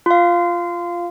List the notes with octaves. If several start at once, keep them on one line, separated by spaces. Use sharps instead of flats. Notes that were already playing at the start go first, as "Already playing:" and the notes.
F4 F5